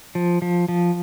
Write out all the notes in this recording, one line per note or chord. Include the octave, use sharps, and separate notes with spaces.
F3
F3
F3